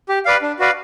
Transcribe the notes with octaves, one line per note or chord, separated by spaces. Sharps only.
G4
B4 D5 F5
D4
F#4 B4 D5 F5